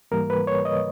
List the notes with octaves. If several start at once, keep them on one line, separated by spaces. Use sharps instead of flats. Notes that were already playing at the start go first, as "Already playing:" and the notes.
G#2 E3 G3 A#3 A#4
B4
C#5
D#5